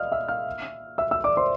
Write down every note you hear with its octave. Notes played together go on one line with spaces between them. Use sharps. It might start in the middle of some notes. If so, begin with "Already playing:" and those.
Already playing: D5 D#5 F5 D#6 F6
E5 E6
F5 F6
E5 E6
E5 E6
D5 D6
C5 C6